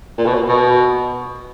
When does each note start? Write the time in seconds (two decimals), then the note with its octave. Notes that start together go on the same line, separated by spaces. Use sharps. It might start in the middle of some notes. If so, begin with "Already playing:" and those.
0.18 A#2
0.26 B2
0.34 A#2
0.48 B2